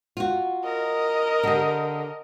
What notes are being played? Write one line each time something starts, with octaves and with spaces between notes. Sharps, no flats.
F4 F#4
A#4 D#5
D3 G4